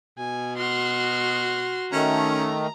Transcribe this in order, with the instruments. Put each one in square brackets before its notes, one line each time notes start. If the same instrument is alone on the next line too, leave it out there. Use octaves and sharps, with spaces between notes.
[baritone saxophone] B2 [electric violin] G#5
[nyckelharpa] F#4 [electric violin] C6 F6
[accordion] D#3 A3 [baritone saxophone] C#4 [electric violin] A#5